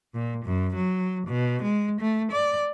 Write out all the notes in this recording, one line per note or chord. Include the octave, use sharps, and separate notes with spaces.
A#2
F#2
F#3
B2
G#3
A3
D5